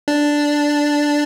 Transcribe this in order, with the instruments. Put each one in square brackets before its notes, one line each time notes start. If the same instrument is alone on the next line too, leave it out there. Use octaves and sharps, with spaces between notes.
[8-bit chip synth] D4